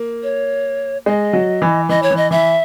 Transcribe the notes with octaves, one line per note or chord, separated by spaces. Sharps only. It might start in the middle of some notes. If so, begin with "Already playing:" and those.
Already playing: A#3
C#5
G#3 D#5
F#3
E3
E3 D#5
C#5
E3
D#5
E3 E5